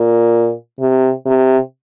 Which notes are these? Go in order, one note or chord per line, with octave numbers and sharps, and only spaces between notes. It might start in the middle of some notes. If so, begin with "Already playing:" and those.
Already playing: A#2
C3
C3